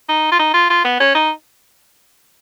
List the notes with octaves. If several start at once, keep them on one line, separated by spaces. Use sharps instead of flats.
D#4
F4
D#4
F4
F4
B3
C#4
D#4